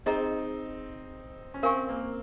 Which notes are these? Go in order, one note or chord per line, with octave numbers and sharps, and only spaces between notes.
C4 D#4 G#4 D#5 A#5
C#4
C4 A#4 F5 G#5 C#6
A#3